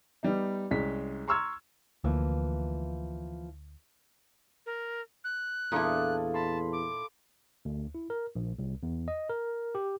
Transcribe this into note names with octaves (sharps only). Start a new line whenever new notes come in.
G3 B3 D#4
C2 G#3 C#4 B6
A#5 C6 C#6 E6 F6 G#6
D2 E3 F3 A#3
A#4
F#6
E2 A#2 D4 E4 A4 F5 D#6
A5 B5 C6
D6
D2
E4
A#4
A#1
C2
E2
D#5
A#4
G4